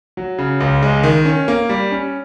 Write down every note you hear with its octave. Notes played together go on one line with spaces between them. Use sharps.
F#3
C#3
C#2
G#3
D#3
C#4
A#3
G3
C#4